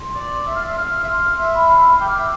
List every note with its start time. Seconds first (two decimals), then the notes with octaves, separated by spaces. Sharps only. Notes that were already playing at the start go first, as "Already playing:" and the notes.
Already playing: C6
0.15 D5
0.47 E5
0.55 F5
0.64 E5
0.77 F5
1.03 E5
1.08 F5 C6
1.38 E5
1.54 B5
1.69 F5
1.78 E5
1.87 F5
2.00 G5 D6
2.09 F5
2.18 E5